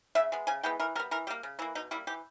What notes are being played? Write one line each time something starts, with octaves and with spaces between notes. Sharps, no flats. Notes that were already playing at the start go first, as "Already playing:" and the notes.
C#3 E5
G#3 B3
C#3 G#5
E3 G#3 B3 G5
E3 A#4
G3 B3 A#4
E3 A#4
G3 A#3 G4
C#3
E3 A#3 E4
B2 D#4
G3 A#3 E4
E3 G4